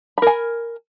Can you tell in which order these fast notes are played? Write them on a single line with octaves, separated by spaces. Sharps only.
B5 A#4 G#5